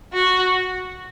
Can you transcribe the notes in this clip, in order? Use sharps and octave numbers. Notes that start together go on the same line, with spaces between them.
F#4